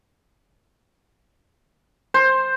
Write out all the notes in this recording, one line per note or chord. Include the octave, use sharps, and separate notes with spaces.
C5